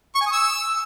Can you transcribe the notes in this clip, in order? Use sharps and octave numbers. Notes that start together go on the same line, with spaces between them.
C#6
G#5
D#6
E6